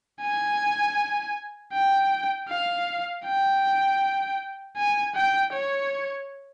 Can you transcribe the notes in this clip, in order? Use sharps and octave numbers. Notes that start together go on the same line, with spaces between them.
G#5
G5
F5
G5
G#5
G5
C#5